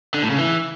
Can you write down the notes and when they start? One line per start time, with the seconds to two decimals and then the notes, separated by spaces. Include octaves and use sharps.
0.14 D3
0.22 A2
0.30 C#3
0.38 E3